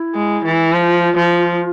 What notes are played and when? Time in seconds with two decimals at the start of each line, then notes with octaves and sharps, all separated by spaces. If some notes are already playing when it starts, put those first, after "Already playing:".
Already playing: E4
0.15 G#3
0.45 E3
0.73 F3 F4
1.17 F3